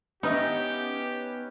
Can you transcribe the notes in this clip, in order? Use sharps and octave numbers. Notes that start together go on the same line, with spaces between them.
B3 C#4 D#4 G4 B4 D#5 E5